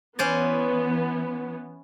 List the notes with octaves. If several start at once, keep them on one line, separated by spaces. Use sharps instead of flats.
E3 B3 C#4 C5 D5